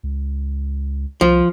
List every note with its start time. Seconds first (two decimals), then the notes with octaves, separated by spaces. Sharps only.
0.03 C#2
1.21 C2 F3